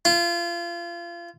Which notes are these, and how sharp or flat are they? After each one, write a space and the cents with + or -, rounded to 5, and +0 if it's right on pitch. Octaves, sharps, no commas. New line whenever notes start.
F4 -30